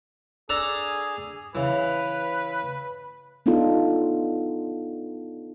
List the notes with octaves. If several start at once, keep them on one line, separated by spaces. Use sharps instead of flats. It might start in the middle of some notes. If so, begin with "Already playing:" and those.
D4 G#4 A4 A#5
C#3 E3 B4
B3 D4 D#4 F4 A4